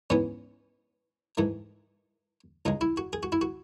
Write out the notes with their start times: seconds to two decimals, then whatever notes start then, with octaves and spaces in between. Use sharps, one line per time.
0.10 G#2 E3 B3 C#4
1.37 G#2 E3 A3
2.65 C#2 C#3 G#3 D#4
2.81 E4
2.97 F#4
3.13 G#4
3.23 F#4
3.32 E4
3.41 F#4